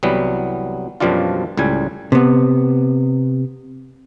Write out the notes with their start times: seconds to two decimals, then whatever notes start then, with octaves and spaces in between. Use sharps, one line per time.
0.03 C2 E3 F#3 G3 B3
1.00 F#2 B2 F3 G3 D4 F4
1.57 C#2 A2 G3 G#5
2.12 C3 B3